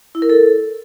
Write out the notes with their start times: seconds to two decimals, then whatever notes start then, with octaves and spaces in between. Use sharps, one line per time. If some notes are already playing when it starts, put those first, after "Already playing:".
0.15 E4
0.22 A#4
0.29 A4